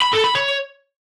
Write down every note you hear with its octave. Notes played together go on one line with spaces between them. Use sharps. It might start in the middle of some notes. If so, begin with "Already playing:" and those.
B5
A4
B5
C#5